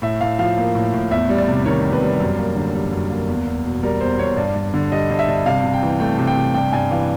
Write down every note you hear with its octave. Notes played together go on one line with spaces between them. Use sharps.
A2 E5
A2 F5
F3 F5
A#3
A2
A2
E2 E5
G3
D5
C3
D#3 C#5
E2
B4
G3
F#2
A#3
D3
G3
F#2
A#3
E2
E2
B2
G3 A#4
E2 C5
E2 C#5
G2 D5
G2
D3
G3 D#5
G2
E5
G2
C3 F5
C3
G5
E3
A3 G5
C3
G5
C3
G2 G5
G2 G#5
E3 F5